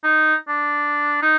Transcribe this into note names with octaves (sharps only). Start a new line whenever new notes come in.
D#4
D4
D#4